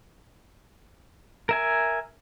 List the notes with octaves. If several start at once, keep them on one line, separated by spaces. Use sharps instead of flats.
A#4 E5 G#5